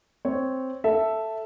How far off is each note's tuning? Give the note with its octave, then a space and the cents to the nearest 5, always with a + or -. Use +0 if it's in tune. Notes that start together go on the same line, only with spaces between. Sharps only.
C4 +0 C#5 +0
A4 +0 E5 +0